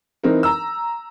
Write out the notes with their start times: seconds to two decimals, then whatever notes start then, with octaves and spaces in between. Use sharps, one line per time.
0.23 E3 C4 D#4 A#4
0.43 A#5 E6